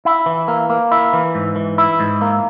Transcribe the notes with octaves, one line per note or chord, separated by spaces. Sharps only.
E4
E3
A#3
A#3
E4
E3
G#2
E3
E4
G#2
A#3